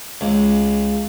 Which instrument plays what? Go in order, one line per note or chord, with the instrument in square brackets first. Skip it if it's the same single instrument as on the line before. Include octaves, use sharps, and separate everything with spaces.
[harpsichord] C#2